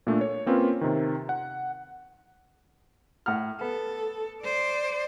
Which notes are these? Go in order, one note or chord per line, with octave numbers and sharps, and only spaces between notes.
A#2 A3 D4
C#5
A#3 C4 C#4 F4 B4
C3 D#3
F#5
A2 F#5 F6
B3 A4
C5 D5